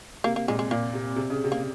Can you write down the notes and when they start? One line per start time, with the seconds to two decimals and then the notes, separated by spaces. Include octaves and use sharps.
0.24 C3 A#3
0.36 A#3
0.48 A#2 G#3
0.59 G#3
0.71 A#2 A#3
0.93 C3
1.16 C3
1.30 C#3
1.44 C3
1.52 A#3